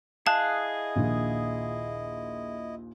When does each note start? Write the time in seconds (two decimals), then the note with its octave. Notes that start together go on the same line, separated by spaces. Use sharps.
0.27 E4 G#4 D#5 F5 A5 F#6
0.96 A#1 D#2 A#2